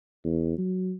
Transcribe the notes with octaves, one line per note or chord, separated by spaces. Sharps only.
E2
F#3